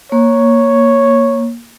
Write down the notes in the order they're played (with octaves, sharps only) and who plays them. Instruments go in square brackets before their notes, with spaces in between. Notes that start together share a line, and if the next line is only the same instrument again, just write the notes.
[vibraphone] A#3 [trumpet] C#5